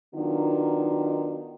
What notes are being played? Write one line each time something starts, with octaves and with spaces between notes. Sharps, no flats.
D#3 F#3 B3 D4 D#4 F4